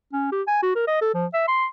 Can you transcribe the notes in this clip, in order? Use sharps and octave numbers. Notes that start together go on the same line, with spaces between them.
C#4
G4
G#5
F#4
A#4
D#5
A4
F3
E5
C6